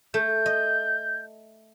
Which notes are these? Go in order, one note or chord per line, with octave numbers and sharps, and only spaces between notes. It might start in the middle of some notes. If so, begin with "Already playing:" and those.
A3 G6
D#5